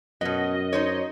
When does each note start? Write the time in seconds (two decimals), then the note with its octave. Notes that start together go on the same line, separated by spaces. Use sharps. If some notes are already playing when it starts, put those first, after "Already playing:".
0.21 F#2 B2 B3 D#5
0.73 D#4 C5 C#5